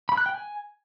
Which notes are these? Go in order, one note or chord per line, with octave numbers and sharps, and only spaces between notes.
B5
F#6
G5
G#5